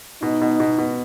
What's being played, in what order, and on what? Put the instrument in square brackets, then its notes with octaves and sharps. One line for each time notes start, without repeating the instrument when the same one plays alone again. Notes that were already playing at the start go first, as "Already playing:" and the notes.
[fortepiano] B2 [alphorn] D#4
[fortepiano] B2
B2
B2